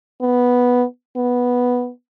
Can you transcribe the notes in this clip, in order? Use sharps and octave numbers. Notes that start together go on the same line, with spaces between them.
B3
B3